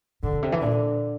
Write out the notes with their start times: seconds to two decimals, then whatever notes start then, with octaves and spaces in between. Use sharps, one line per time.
0.23 A2 D3
0.33 A#2
0.43 C3
0.52 E3
0.62 A#2 D3